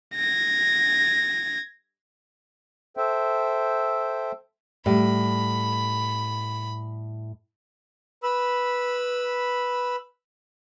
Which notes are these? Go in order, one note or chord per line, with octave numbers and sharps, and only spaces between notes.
G#6 A#6
A4 C5 E5 G5
A2 G3 E4 B5
B4 B5 E6